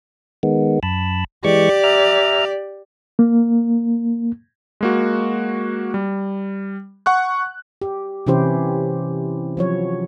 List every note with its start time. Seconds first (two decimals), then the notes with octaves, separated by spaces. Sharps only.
0.43 D#3 G#3 B3
0.83 F#2 A5 B5
1.45 E3 G#3 G4 D5 C#6
1.84 E5 A#5 F6
3.19 A#3
4.81 G#3 A#3 F#4
5.94 G3
7.06 F#5 C#6 F#6
7.82 G4
8.27 C3 E3 C#4 E4 G4 C5
9.57 F3 F#3 C#5